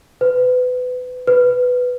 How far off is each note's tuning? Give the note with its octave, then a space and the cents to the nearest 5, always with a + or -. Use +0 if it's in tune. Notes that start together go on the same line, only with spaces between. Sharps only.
B4 +25
B4 +5